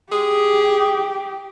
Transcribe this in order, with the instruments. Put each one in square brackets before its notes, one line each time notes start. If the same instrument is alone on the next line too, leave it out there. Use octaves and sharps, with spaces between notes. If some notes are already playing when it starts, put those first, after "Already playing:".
[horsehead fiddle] G4 [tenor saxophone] G#4